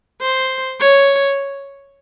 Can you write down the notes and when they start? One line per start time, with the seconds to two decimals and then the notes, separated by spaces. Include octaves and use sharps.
0.21 C5
0.80 C#5